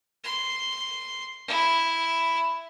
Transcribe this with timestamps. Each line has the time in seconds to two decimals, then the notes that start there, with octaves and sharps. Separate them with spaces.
0.24 C6
1.48 E4